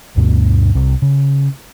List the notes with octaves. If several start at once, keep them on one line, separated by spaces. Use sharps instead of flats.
D2 G2 B2
C2
C#3